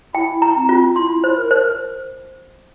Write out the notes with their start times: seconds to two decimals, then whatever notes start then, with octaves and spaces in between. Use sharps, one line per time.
0.15 E4 G5
0.42 A#5
0.56 C4
0.69 F4
0.96 E4 C6
1.24 C5
1.37 A#4
1.51 C5